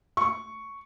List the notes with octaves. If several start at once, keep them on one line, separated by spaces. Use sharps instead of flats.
C#6